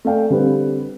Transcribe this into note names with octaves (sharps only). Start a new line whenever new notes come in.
A3 D5 F5 G5
D3 G3 C4 B4